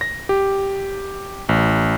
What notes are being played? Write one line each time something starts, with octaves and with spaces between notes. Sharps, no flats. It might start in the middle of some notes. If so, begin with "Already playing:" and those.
A#6
G4
A1